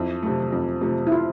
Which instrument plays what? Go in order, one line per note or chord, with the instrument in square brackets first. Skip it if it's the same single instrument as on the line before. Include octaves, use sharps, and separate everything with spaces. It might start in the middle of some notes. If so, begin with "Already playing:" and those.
Already playing: [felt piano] F2 [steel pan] E4
[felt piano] C3 F3 A3
F2
C3 F3 A3
[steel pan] E4
F4